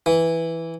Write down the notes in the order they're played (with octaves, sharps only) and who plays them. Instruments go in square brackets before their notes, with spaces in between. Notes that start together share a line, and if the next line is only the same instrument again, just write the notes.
[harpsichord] E3